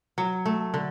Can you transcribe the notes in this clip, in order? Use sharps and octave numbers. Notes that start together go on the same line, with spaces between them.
F#3
A3
D3